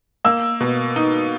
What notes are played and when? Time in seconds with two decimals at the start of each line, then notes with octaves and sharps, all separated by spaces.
0.25 A#3 E6
0.60 B2
0.96 D#4